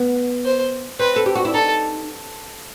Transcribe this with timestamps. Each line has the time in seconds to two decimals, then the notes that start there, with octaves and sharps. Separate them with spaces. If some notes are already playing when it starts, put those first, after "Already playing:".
Already playing: B3
0.45 C5
0.99 C4 B4
1.16 A4
1.26 G4
1.35 F#4
1.45 E4
1.54 D#4 A4